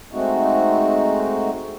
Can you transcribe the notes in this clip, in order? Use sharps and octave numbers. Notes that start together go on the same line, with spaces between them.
G#3 A3 C4 D#4 F#4